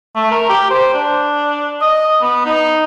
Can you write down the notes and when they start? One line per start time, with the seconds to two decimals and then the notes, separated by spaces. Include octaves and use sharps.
0.16 A3
0.31 A#4
0.49 G4
0.71 C5
0.94 D4
1.81 D#5
2.21 B3
2.45 D#4